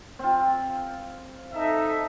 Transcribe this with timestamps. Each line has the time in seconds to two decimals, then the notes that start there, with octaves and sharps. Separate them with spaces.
0.19 C4 F4
1.53 D#4 A4 E5